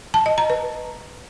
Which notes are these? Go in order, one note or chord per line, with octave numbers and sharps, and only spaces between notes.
A5
D#5
A#5
B4